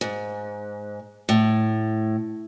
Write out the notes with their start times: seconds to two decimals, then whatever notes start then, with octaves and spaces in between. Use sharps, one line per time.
0.01 G#2
1.29 A2